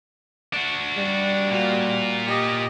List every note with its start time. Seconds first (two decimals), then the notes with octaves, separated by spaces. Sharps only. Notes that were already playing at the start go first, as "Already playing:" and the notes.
0.54 D4 F#4
0.98 G3
1.50 A#2 A#3 F4 F#4
2.27 G4 D#5